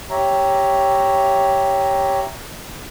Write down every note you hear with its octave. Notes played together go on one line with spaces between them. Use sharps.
G4 C#5 E5 A#5